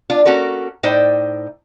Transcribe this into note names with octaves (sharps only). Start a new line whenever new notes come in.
D4 F4
A#3 C#4 F#4 A4 A#4
A2 D#4 C5 D5 G5